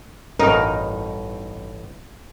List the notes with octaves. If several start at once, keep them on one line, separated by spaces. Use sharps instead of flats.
A1 G2 B2 D#4 A#4